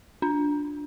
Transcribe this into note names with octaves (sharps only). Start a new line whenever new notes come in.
D4